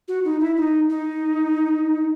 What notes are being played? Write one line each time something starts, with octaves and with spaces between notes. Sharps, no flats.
F#4
D#4
E4
D#4
D#4